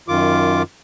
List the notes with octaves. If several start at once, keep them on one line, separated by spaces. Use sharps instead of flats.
F#2 D#3 F4 D6